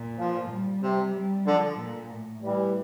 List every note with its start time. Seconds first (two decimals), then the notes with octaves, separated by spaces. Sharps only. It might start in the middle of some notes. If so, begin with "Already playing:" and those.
Already playing: A#2
0.18 F3
0.50 G3
0.82 C3
1.15 G3
1.46 D3 F3
1.79 A#2
2.11 A2
2.42 A2 E3 G3